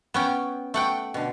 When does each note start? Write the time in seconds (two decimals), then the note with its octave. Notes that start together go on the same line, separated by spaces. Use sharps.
0.14 B3 C#4 G5
0.74 A3 F#5 G5
1.14 B2 D3